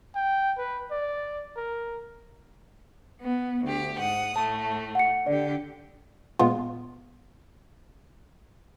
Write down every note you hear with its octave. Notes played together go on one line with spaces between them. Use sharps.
G5
B4
D5
A#4
B3
D2 G4
G#2 F#5 D#6
A2 A3 A5
F#5 C#7
D3 G4 D5
A#2 G#3 B3 F4